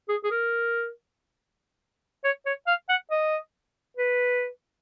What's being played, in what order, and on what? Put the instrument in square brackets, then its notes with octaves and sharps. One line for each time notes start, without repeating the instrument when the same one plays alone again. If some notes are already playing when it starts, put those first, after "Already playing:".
[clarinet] G#4
G#4
A#4
C#5
C#5
F5
F#5
D#5
B4